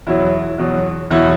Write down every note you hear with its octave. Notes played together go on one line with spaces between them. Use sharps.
E2 B2 F#3 E4
E2 B2 F#3
E2 B2 F#3 E4